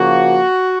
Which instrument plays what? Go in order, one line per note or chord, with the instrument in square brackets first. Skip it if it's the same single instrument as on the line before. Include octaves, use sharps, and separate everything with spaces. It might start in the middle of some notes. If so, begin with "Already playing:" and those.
Already playing: [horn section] C#3 F3 A#3 F#4